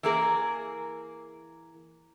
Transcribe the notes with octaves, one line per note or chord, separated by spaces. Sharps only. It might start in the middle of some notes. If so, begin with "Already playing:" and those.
E3 A#3 G#4 A#4